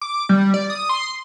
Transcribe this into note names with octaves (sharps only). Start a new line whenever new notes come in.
D6
G3
D5
D#6
C6